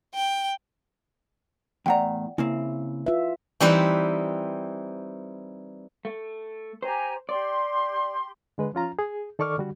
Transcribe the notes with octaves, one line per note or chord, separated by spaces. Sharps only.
G5
E2 A2 D5 F#5 G5 A#5
C#3 A#3 C4 E4
F4 B4 E5
E3 G3 C4 D#4 B4 C5
A3
G4 C5 G#5 A#5
G4 D5 C6
D3 G#3 B4
F3 C#4 F4 A#5
G#4
D#3 A4 D5 C#6 D6 F6
D3 G3 F#4